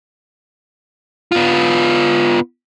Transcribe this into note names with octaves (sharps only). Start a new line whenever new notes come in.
B3 F4